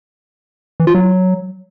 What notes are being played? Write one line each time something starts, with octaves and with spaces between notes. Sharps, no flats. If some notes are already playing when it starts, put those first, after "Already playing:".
E3
F4
F#3